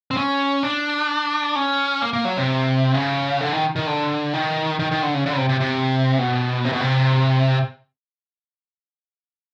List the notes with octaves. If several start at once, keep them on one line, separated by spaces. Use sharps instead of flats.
C4
C#4
D4
C#4
A#3
A#3
F#3
C3
C#3
D3
D#3
D#3
D3
D#3
D#3
D#3
D3
C#3
D3
C#3
C3
C3
C3
B2
C3
B2
C3